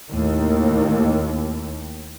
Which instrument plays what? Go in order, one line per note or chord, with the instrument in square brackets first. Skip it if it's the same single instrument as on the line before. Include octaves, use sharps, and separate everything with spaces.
[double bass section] D#2 [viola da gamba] A2